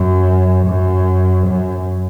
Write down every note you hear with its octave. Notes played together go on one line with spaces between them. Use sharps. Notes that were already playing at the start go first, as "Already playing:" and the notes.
Already playing: F#2
F#2
F#2